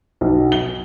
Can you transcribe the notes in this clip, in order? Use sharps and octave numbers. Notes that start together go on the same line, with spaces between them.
B1
G7